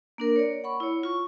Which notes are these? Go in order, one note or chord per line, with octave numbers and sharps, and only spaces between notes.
A#3 D4 A#4
C#5 D5
F#5 B5 C#6
E4 C#5
F4 C#6